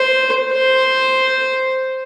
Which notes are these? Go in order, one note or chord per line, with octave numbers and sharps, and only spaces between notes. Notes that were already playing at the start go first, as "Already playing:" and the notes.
Already playing: C5
C5